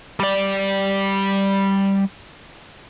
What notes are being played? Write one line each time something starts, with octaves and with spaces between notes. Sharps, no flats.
G3 D5